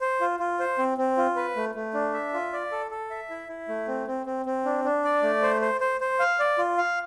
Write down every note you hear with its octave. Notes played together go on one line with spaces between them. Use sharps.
C5
F4
F4
C5
C4
C4
F4
B4
A3
A3
D4
E5
F4
D5
A4
A4
E5
E4
E4
A3
C4
C4
C4
C4
D4
D4
D5
A3
C5
C5
C5
C5
F5
D5
F4
F5